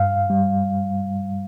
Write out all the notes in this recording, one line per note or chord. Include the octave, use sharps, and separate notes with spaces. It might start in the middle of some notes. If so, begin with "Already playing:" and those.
Already playing: G2 F5
G3